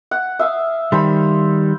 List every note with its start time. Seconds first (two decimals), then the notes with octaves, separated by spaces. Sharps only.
0.11 F#5
0.39 E5 F5 D#6
0.92 D#3 G3 C5 B5